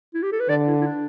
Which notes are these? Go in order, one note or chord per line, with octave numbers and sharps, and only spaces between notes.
E4
G4
A4
B4
D3 D5
E4
E4
D4